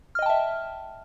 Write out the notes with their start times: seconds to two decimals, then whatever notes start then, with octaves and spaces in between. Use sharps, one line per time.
0.15 F6
0.19 D#5
0.22 G5
0.26 A5
0.30 E5